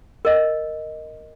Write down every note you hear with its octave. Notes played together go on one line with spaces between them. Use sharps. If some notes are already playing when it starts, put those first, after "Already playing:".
A#4 D#5